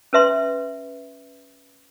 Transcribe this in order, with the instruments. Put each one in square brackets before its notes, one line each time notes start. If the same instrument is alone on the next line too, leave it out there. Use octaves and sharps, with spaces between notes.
[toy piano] C#4 B4 E5 C6